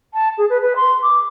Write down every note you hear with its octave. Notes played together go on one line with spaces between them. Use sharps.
A5
G#4
B4
B4
C6
D6